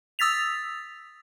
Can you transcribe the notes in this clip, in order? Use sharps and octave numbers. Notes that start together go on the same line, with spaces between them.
D#6 E6 A6 B6 F7